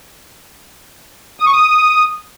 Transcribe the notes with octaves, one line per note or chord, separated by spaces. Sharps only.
D#6
C#6
D#6